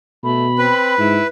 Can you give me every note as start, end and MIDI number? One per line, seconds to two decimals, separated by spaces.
0.24 0.69 47
0.24 0.46 57
0.24 1.01 83
0.58 0.94 60
0.58 1.27 71
0.98 1.19 44
0.98 1.23 64